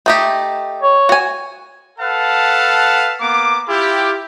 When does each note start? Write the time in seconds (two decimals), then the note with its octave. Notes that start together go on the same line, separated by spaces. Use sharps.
0.06 A3 D#4 G4
0.82 C#5
1.09 F#4 G#5
1.99 A4 B4 F5 F#5 A5
3.21 A#3 B3 D6
3.68 E4 F4 G4